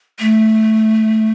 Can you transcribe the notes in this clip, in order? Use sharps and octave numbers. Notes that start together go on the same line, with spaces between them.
A3